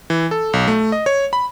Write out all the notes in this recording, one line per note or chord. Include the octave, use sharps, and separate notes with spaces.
E3
A4
B1
A3
D#5
C#5
B5